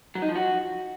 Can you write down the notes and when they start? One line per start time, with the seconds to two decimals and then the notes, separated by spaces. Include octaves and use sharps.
0.15 F#3
0.22 D#4
0.29 F3
0.36 F#4